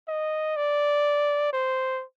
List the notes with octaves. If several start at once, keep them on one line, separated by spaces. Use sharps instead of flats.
D#5
D5
C5